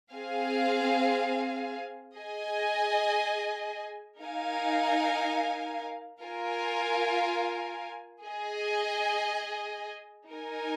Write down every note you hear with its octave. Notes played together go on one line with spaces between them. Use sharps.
C4 G#4 F5 G#5
G#4 D#5 G#5
D#4 A#4 F5 G#5
F4 A#4 F5 G#5
G#4 D#5 G#5
D#4 A#4 G#5